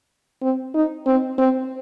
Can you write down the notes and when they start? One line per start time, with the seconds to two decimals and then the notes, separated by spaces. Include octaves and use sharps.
0.42 C4
0.75 D#4
1.06 C4
1.38 C4